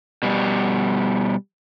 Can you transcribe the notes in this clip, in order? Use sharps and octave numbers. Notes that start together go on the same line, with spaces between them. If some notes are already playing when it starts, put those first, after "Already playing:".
B2 G3